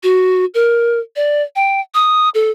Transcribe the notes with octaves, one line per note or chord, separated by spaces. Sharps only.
F#4
A#4
D5
G5
D#6
A4